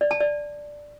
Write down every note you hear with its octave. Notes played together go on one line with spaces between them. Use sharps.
D5
A5
D5